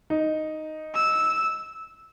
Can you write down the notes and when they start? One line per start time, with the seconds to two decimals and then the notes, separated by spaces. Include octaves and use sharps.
0.10 D#4
0.94 E6